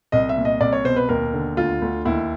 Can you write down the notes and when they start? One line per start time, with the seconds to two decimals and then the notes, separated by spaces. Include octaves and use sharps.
0.12 C2 D#5
0.29 E5
0.37 A#2
0.45 D#5
0.61 C2 D5
0.73 C#5
0.84 B2 C5
0.96 B4
1.09 D#2 A#4
1.33 D3
1.57 D2 F4
1.82 D2
2.05 D#2 E4